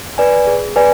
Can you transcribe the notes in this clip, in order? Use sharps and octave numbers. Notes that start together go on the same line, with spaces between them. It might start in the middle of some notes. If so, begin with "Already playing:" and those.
B4 D5 G#5
G#4
B4 D5 G#5